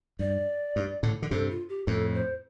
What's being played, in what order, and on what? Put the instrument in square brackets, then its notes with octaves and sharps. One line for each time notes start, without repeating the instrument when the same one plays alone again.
[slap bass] G2 [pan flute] D5
[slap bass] G2
A2 D3
D3
[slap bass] G2 C3 [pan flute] A4
[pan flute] F4
G4
[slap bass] F2 A2 [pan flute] A4
[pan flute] C5